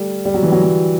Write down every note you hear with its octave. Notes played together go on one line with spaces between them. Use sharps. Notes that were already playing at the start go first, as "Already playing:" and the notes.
Already playing: G3 A3
G3
F#3
E3
F#3
F#3